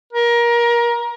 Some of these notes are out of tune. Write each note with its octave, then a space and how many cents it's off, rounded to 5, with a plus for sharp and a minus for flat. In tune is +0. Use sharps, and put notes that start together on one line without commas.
A#4 +25